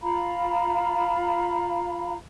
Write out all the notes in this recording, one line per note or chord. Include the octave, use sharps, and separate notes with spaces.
F4 F5 A#5 B5